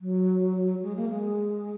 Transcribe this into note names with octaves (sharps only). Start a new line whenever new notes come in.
F#3
G#3
A#3
G#3